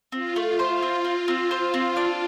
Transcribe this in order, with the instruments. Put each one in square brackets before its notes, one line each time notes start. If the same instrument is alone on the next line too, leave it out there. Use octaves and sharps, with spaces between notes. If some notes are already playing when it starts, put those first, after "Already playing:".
[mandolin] C4 [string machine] F4
[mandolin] A3
[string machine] F4
[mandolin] C5
C4
C4
C4
C5
C4
D4